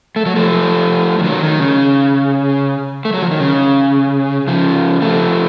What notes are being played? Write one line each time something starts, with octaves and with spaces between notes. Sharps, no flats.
A3
F#3
F3 A3
F3
D#3 F#3
D#3
C#3
A3
F#3
F3
D#3
C#3
C#3 F3
F3 A3